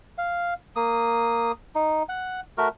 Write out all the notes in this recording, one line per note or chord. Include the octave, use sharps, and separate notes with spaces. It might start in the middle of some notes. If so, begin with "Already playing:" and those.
F5
A#3 D#6
D#4
F#5
A3 F#4 A#4